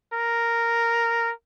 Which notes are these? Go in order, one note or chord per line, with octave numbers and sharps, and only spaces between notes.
A#4